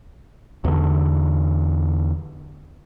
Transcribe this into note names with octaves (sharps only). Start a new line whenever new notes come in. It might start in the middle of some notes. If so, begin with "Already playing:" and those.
E2 D3